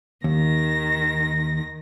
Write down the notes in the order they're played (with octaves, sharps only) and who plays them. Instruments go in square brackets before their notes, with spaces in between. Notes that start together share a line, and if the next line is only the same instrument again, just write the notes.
[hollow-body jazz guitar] D#2 [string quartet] D#3 A#6